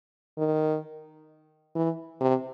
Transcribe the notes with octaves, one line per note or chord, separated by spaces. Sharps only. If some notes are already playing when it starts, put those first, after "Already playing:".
D#3
E3
C3